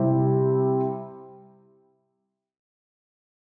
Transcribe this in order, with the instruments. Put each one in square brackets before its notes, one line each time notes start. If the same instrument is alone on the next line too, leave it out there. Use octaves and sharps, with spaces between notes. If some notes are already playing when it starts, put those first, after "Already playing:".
Already playing: [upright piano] C3 G3 C4 E4 G4